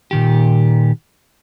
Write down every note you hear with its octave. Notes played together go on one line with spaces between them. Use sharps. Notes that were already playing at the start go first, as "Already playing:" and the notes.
A#2 D#3 G4